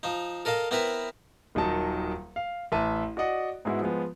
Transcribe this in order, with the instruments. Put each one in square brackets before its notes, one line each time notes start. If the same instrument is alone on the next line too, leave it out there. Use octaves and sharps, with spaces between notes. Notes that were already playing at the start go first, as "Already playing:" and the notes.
[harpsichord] F3 D#4
A4 A#4 D#5 F5 A5
B3 C4 E4 A#4 B4 E5
[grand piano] D#1 D#3 F#3 D#4 A5
F5
A1 E5 A5 D#7
F#4 D5 D#5 F#5
G#2 G#3 B3 E4 F#4
F3 G#3 B3